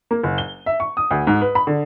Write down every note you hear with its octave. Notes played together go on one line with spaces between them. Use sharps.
A#3
F#1
G7
E5
C#6
D#6
D2
G#2
B4
B5
D3